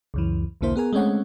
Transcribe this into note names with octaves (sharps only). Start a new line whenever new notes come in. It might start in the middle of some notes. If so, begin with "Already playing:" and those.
C#2 F#2 E3
B1 E2 D3 A#3 E4 C5
B3 G#4 A#4 G#5
G#3 A3 C4 C#4 C#5 F#5